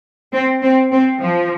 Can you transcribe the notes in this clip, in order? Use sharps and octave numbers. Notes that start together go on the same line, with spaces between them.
C4
C4
C4
F3